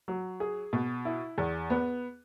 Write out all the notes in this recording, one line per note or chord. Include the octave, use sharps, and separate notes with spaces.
F#3
G#4
B2
E4
E2
B3